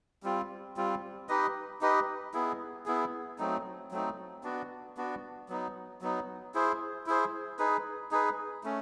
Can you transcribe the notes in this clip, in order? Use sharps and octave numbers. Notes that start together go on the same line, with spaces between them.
G3 C4 F4
G3 C4 F4
D#4 G4 B4 D#5
D#4 G4 B4 D#5
B3 E4 G#4
B3 E4 G#4
F#3 A3 C4 D#4
F#3 A3 C4 D#4
B3 D4 F#4
B3 D4 F#4
F#3 B3 D#4
F#3 B3 D#4
E4 G#4 C5
E4 G#4 C5
D#4 G#4 B4
D#4 G#4 B4
A3 C#4